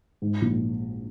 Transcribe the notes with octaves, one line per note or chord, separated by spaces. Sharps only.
G#2
A#1